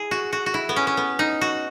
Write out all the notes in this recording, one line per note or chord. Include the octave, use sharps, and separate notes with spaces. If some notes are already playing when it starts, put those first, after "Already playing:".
Already playing: E4 G#4
F#4
F#4
F#4
E4
B3
C#4
C#4
B3
D#4
F#4